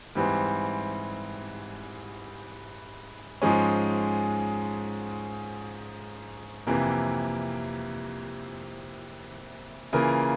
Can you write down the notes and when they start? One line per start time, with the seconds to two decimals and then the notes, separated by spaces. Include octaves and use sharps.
0.15 G#2 E3 G3 C4
3.42 G#2 F3 G#3 C#4
6.67 F2 C3 E3 A#3
9.93 C#3 E3 A#3 F4 A#4